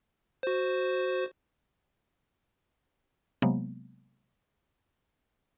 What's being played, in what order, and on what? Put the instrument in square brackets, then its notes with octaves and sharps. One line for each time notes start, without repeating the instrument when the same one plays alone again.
[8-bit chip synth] F#4 C5
[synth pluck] C3 F#3 G#3 A#3 B3